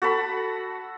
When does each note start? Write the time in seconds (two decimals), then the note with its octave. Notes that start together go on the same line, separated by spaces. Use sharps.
0.02 F#4 A4 A5 B5